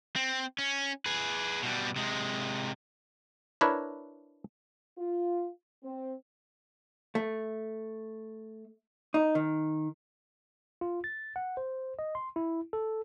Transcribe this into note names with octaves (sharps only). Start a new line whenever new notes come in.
C4
C#4
G#4 B4
B2 G3
C3 G#3
D4 E4 A#4 B4 C#5
F4
C4
A3
D#4
D#3
F4
A6
F#5
C5
D#5
C6
E4
A4